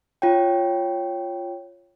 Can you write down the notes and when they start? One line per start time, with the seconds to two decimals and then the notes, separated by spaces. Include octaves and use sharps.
0.22 F4 C#5 G5